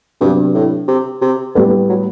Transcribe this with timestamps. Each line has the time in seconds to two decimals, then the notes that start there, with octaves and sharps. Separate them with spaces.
0.21 G2 C3 F#3 B3 D4
0.54 A2
0.88 C3
1.22 C3
1.55 A2 D3 G3 B3
1.89 F#3